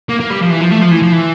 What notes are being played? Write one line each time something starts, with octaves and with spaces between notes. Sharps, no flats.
A#3
A#3
G3
F3
E3
F3
A3
F3
E3
F3
E3